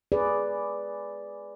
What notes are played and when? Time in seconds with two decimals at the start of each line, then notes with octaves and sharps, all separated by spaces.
0.12 G#4 B4 D5